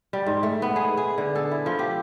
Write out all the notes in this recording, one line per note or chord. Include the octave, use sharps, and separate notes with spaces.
G3
G#2
A3
B3
G#4
G#4
D3
A4
E4
F3
G4